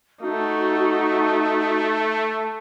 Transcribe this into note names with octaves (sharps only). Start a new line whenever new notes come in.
A3 D#4 F#4